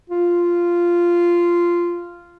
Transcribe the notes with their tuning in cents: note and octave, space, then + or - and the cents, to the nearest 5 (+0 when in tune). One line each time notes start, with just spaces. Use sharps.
F4 -10